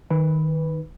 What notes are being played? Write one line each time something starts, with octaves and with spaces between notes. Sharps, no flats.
D#3 B4